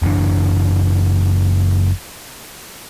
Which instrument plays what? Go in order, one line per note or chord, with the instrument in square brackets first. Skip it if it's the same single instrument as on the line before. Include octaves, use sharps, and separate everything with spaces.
[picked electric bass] F#1 F#2 E3 D4